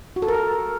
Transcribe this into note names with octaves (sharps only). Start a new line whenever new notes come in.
F#4
A4
A#4
A4